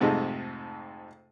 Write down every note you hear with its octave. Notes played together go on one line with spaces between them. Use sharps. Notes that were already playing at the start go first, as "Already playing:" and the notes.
F2 G#2 C3 A3 D#4